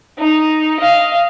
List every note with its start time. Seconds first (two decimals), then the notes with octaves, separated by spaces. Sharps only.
0.19 D#4
0.80 D#5 F5